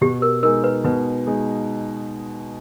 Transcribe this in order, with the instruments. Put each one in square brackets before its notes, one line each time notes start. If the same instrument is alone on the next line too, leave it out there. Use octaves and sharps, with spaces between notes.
[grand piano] B2 [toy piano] G4
[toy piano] A#4
[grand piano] G#3 D#4 [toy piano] A#4
[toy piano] B4
[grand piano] B2 [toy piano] B4
[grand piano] G#3 D#4